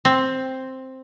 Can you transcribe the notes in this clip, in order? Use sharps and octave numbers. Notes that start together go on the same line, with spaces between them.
C4